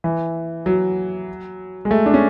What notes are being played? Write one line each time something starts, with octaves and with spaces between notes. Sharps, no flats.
E3
F#3
G#3
A3
D4
C#4